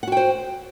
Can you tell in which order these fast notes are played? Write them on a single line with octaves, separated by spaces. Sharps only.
F#5 F#4 G5 C5